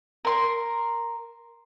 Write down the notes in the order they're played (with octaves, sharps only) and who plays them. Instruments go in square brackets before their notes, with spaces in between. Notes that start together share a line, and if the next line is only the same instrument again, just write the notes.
[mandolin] A#4 C6